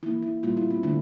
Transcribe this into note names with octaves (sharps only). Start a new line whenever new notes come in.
E3 A#3 E4
E4
A#2 G3 A#3 F4
E4
C4
D3 A3 D4